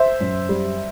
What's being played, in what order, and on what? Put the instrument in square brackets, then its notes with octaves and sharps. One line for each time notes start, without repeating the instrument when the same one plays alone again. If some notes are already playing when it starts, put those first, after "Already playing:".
Already playing: [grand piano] C5 E5
F#2
G3